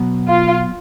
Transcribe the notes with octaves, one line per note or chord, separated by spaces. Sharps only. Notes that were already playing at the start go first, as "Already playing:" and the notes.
Already playing: B2 F#3 B3
F4